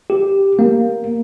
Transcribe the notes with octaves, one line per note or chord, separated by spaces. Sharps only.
G4
A#3